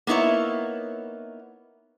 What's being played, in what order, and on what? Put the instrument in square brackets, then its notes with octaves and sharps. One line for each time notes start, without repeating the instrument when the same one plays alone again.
[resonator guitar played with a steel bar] A#3 B3 D#4 E4 C#5